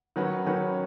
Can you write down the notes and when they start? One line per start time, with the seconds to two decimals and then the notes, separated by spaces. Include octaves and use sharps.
0.16 D#3 F#3 C#4 B4
0.46 D#3 F#3 C#4 B4